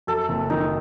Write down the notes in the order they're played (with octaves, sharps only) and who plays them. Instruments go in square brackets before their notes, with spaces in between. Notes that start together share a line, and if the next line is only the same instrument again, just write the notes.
[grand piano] F#2 [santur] A4
[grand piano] F#1
[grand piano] D#3 [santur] D#4